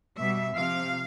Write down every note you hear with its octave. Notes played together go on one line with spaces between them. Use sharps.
B2 G3 E5
C3 F3 F5